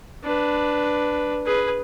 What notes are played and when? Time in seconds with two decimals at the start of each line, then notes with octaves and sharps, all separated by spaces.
0.24 D4 B4
1.46 G#4 B4